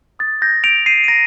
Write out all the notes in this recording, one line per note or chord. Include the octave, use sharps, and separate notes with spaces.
D#6 A6
G6 A#6
G6 D7 F7
C7 D#7
D#7
A#5 A#6 D7